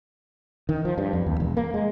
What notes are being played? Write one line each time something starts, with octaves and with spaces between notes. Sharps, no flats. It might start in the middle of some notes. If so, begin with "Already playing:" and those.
D#3
F3
G2
F2
D#2
E1
A#3
G#3